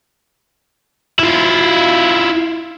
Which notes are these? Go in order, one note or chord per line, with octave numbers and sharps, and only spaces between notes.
E4 F4